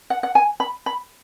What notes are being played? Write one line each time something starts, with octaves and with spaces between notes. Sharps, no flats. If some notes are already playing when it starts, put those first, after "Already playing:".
F#5
F#5
G#5
B5
B5